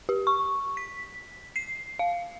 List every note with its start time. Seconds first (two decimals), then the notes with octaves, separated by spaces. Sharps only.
0.09 G4
0.27 C#6
0.77 B6
1.56 C7
1.99 F5